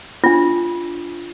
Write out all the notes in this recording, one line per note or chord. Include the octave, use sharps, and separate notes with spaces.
D4 F4